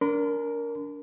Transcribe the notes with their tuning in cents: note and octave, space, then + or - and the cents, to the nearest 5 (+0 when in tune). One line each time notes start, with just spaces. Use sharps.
D4 -35 A#4 +0 C6 -45